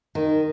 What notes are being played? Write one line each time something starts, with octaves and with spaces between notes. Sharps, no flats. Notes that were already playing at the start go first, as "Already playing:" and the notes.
D#3